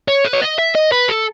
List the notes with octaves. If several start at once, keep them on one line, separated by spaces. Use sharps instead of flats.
C#5
B4
C#5
D#5
E5
D#5
B4
A4